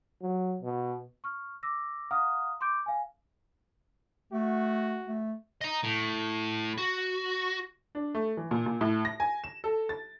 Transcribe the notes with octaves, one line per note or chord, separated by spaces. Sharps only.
F#3
B2
C#6 F6
D6 E6 A#6
F5 F#5 A#5 D#6 F6
C6 D6 G6 D7
F5 G#5
A3 F#4
A3
D#5 A#5
A2
F#4
D4
A3
E3
A#2
A#2
A2
A#6
G#5
E7
A4
A6